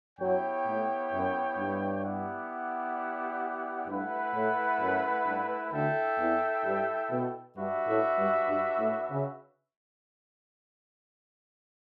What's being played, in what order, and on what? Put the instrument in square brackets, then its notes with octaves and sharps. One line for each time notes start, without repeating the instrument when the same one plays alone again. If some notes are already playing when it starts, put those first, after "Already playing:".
[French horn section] F#2 F#3 [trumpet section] B3 E4 G4 C#5 G5
[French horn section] A2
F#2
G2
[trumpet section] B3 E4 G4 D5 F#5
[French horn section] G2 [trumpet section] A3 E4 B4 F#5
[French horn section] A2
F#2
G2
[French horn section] D2 D3 [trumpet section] E4 A4 E5 G5
[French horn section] E2 E3
G2 G3
B2
[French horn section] G2 [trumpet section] D4 F#4 B4 E5
[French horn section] A2
G2
G2
A2
C#3